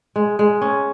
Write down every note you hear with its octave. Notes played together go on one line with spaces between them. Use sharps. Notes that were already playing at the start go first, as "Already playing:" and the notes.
G#3
G#3
C#4